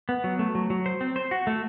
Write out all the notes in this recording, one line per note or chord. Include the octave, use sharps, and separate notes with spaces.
B3
F#3
A3
F#3
F#3
C5
C4
C5
F#4
A3